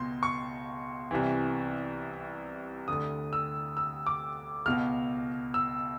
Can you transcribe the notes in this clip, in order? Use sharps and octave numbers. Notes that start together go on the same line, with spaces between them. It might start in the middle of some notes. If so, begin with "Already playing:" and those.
Already playing: C#2 B2 C6
C#6
C2 C3 E3
D2 D3 D#6
E6
E6
D6
C#2 B2 F6
E6